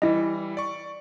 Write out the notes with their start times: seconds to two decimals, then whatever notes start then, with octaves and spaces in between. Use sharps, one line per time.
0.02 E3 G3 E4 D#5
0.57 D5 C#6